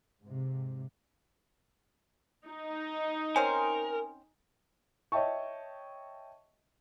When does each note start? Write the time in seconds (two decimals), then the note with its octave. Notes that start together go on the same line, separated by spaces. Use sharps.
0.21 G#2 C3
2.46 D#4
3.36 C4 C#4 A#4 C5 G#5
5.12 C#5 D#5 E5 G5 A5 C#6